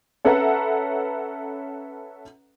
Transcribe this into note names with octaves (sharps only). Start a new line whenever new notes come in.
C#4 A4 B4 E5 F#5 A#5